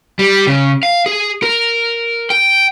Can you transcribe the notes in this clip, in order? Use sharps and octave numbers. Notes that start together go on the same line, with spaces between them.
G3
C#3
F5
G#4
A#4
G5